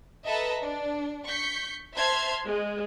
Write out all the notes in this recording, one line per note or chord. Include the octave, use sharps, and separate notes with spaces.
A4 B4 D#5 E5 A5 A#5
D4
C#6 G6 B6 C#7
C5 E5 A5 C6 F6 G#6
G#3